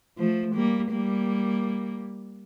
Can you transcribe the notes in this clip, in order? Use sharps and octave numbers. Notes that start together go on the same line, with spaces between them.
F3 A3
G3 A#3
G3 A#3